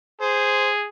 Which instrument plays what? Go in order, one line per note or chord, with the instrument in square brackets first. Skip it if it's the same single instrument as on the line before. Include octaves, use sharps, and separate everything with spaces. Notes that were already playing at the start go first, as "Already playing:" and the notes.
[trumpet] G#4 [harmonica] C5